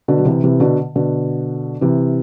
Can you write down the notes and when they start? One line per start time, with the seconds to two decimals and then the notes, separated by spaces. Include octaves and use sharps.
0.08 B2 D3
0.18 F#3
0.25 C3 E3
0.44 C3 E3
0.60 B2 D3
0.96 B2 D3
1.81 C3 E3